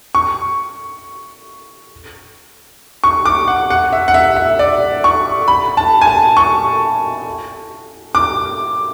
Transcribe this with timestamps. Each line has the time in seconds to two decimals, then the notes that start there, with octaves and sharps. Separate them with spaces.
0.15 C#6
3.04 C#6
3.26 D6
3.48 F#5
3.70 F#5
3.93 E5
4.08 F#5
4.14 E5
4.36 E5
4.59 D5
5.04 C#6
5.48 B5
5.77 A5
6.01 G#5
6.07 A5
6.37 C#6
8.15 D6